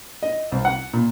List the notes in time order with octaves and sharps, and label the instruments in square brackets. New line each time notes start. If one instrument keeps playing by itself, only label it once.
[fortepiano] D#5
C2
F#5
A#2